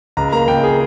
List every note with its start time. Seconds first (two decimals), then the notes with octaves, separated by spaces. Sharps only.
0.17 C#2 A#5
0.32 A#3 A#5
0.48 C#2 G5
0.64 G#4